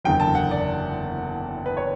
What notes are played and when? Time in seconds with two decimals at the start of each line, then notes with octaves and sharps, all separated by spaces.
0.04 F#1 E2 D3 F#3 G5
0.20 A5
0.35 F#5
0.51 D5
1.66 B4
1.77 C#5